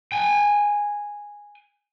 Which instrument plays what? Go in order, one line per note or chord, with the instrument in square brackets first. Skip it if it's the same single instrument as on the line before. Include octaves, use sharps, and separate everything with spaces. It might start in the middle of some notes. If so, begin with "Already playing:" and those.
[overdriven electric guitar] G5 G#5